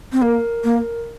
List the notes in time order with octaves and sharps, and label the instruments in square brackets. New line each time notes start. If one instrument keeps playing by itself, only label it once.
[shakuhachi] C4
[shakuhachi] A#3 [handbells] A#4
[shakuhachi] A#3